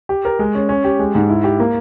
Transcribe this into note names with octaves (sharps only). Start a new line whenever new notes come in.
G4
A#4
G#3
C#4
C#4
G4
G#3
G#2
E4
G4
A#3